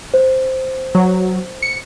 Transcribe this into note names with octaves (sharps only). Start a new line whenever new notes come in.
C5
F#3
C#7